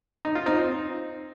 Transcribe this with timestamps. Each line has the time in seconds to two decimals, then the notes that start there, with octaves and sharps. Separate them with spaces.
0.25 D#4
0.35 F4
0.46 C4 D#4